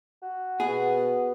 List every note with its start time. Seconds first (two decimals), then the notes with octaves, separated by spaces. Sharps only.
0.22 F#4
0.60 B2 B3 G#4